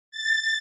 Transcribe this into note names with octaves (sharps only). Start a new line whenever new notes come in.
A6